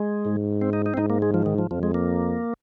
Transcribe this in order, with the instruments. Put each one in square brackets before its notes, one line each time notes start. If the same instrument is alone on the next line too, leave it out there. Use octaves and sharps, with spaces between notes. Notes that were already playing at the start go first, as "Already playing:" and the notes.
Already playing: [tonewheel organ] G#3
[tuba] G#2
[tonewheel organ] C4
D#4
D#4
C4
[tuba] G#2 [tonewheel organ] D#4
[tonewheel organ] A#3
G#3
F3
D#3
F3
[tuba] F2 [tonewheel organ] F3
[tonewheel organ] G#3
A#3